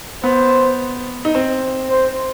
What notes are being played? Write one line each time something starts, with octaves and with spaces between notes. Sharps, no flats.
B3 C5
D#4
C4
C5